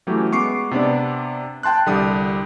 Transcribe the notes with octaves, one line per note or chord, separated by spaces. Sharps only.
E3 F#3 A3 C#4 G4
G#3 B3 C#6 D6 C7
C3 B3 D4 D5
G5 A5 C6 F#6
C2 D3 G3 G4 D#6